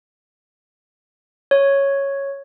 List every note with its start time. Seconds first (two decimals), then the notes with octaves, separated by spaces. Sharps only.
1.51 C#5